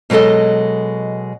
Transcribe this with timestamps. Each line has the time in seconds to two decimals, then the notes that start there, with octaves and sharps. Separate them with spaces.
0.10 B2 F#3 G#3 A4 D#5